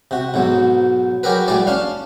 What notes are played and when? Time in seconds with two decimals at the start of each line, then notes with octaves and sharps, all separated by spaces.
0.11 C3 F#4
0.34 B1 G#2 F#3
1.23 F#3 G4 G#4 A#4 B4
1.48 A2 G3 G#4 D5
1.67 C#4 D4 F5